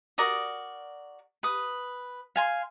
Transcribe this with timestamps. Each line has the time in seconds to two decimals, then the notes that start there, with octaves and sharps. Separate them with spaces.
0.18 F#4 A#4 D5 D#6
1.43 B4 D#6
2.36 F5 G#5 C6